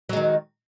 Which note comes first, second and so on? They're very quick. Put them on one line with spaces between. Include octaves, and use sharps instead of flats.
F#3 G#3 D#3